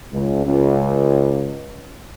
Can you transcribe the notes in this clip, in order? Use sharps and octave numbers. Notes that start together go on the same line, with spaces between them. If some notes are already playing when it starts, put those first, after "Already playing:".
C#2
C#2